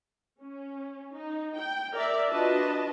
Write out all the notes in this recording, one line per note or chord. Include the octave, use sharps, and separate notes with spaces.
C#4
D#4
G5
A#4 D5 E5
D4 F4 F#4 B4 D#5 A5